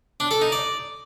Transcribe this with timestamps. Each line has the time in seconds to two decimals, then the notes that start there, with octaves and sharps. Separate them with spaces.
0.20 D4
0.31 A4
0.42 D#4
0.52 D5